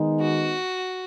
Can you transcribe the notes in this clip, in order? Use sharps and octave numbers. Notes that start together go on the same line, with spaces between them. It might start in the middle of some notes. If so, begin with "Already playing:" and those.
Already playing: D#3 G#3 B3 D#4
F#4